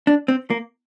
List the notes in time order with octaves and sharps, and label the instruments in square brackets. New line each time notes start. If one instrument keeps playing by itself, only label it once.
[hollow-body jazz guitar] D4
C4
A#3